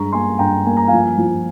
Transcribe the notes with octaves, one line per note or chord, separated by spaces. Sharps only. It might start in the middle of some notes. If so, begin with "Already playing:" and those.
Already playing: G2 G#3 A#5 C#6
A#3 G#5 C6
G2 G5 A#5
A#3 G#5
A#5
F3 F5 G#5
F3